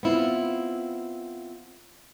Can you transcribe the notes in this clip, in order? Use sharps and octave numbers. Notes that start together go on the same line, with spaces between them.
B3 C4 E4 F4